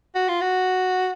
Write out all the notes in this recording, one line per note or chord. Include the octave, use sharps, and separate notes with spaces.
F#4
F4
F#4